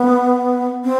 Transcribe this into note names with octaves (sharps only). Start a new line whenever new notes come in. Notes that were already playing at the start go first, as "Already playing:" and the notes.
Already playing: B3
C4